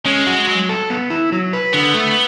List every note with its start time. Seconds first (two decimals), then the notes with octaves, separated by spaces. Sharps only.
0.06 G#3 C#4
0.27 F#4
0.47 F#3
0.69 A4
0.90 B3
1.10 E4
1.32 F#3
1.53 B4
1.73 D3 B3
1.94 A3